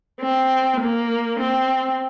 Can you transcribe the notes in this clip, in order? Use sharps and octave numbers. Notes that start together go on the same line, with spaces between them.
C4
A#3
C4